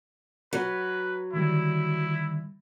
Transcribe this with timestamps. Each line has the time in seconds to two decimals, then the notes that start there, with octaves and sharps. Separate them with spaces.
0.53 F#3 B4
1.33 D3 D#3 G3 E4